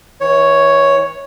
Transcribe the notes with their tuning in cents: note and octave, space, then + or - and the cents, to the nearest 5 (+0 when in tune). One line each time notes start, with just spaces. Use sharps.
E3 -35 C#5 +0